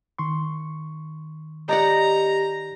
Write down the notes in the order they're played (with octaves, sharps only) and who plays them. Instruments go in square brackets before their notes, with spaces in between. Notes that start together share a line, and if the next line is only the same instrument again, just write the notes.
[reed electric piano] D#3 C6 C#6
[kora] D#4 D5 F#5 [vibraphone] G4 [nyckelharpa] A#5